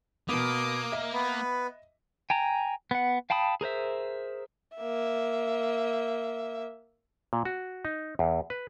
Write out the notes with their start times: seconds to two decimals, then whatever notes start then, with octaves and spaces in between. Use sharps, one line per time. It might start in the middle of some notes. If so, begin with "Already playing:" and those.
0.29 B2 A#3 B3 D6 D#6
0.92 D#5 E5
1.13 B3 B4
2.30 G5 G#5 A#5
2.91 B3 F#5
3.30 F5 G5 A5 B5 D#6
3.61 G#4 A#4 C5 E5
4.77 A#3 E5
7.33 A#2
7.45 F#4
7.85 D#4
8.19 E2
8.50 B4